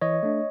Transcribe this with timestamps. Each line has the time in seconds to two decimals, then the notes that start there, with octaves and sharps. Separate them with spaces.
0.01 E3 C#5 D#5
0.23 A3 D4